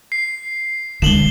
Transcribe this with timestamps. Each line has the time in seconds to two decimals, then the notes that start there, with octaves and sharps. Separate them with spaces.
0.12 C7
1.02 D3 G#3 E7 F#7 G7